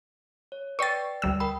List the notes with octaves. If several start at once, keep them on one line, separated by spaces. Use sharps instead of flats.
C#5
B4 D5 G5 C#6 A6
D2 G3 E6
A#4 G5 B5